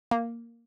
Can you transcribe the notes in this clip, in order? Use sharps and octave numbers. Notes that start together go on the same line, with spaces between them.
A#3